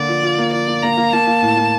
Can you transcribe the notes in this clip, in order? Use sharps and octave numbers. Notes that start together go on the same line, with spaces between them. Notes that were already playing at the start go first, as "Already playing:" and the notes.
Already playing: D3 A#3 D5
F3
F4
A#3
F3 D5
A#3
A#3 A#5
A#3
A#3 A5
A#3
A2
A#3